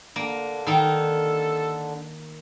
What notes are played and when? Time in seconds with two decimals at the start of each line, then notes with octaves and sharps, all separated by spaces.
0.16 D3 A#3 D4
0.67 D#3 D#4 A4